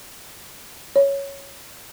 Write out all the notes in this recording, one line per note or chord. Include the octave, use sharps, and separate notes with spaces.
C#5